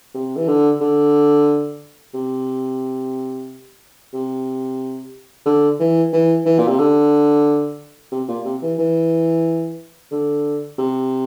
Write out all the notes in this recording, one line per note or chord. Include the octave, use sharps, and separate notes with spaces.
C3
E3
D3
D3
C3
C3
D3
E3
E3
E3
A#2
C3
D3
C3
A#2
C3
E3
E3
D3
C3